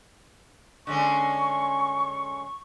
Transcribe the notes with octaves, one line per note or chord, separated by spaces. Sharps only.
D3 G#3 C#4 C#6